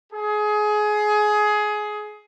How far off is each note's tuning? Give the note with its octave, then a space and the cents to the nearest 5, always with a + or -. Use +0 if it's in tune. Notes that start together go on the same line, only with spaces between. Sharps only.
G#4 +20